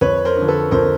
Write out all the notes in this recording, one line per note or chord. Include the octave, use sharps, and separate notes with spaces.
F2 B4 C#5
A#4 C5
D3 F3
A4 B4
F2 A#4 C5